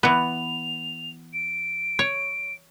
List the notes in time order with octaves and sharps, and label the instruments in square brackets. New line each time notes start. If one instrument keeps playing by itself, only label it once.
[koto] E3 B3 [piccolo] F7
[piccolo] D7
[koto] C#5